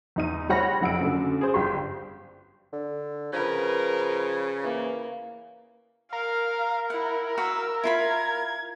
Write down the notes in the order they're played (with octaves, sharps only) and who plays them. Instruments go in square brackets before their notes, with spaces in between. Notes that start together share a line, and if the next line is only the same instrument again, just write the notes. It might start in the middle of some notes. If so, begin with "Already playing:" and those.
[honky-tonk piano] E2 D#4 D#7
G3 C5 C#5 F#5 B5 A#6
F#1 F2 F#5 E6 D7
F#2 D3
G#4 C5
G1 G4 C6
[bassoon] D3
[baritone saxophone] C#3 [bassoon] F3 [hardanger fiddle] A#4 B4
[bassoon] E3 [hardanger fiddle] A#3
[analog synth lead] A#4 [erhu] F5
[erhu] E4 [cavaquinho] F#5
[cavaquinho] F#4 B4 F5 [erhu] E6
[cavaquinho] E4 F4 B5 [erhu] G#6